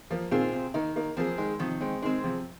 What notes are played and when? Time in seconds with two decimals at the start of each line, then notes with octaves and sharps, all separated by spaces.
0.10 F3 A#3
0.31 A#2 D#3 C4 F4 G#4
0.53 C3
0.74 D#3 A#3 D#4
0.96 A#3 D#4
1.17 F3 A#3 C4 G#4
1.38 D#3 G#3
1.59 C3 D#3 F3
1.81 G#3 C4
2.02 D#3 G#3 C4 G#4
2.24 C3 F3